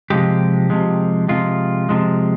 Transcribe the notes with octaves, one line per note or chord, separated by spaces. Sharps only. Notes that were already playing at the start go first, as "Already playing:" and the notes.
C3 F3 G#3 G4
C3 F3 G#3
C3 F3 G#3 F4
C3 F3 G#3